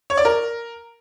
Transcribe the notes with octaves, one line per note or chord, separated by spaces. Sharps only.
C#5
D5
A#4